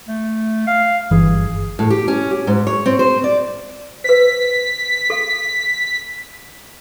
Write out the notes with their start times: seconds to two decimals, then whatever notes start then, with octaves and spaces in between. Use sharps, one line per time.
0.08 A3
0.67 F5
1.11 G1 E3 G#4
1.79 A2
1.90 G4
2.08 C#4
2.31 G4
2.47 G#2
2.67 C#5
2.86 C4
2.99 C5
3.24 D5
4.04 B4 C5 B6
5.10 A4 F5